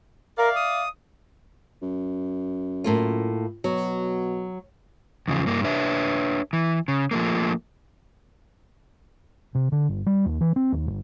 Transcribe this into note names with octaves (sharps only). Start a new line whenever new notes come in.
A#4 D5 E5 F5
D#6
F#2
A2 A#3 F4
B2 F#3
E2 C#3 F3
G2 A#3
D4 B4 C#5 E5
E3
C#3
F3 A3 A#3
C3
D3
G1
G3
D#2
E3
C4
D#2
G1